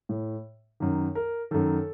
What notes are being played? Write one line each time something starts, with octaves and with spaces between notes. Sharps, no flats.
A2
F#2 D#3
A#4
F#2 D#3 A4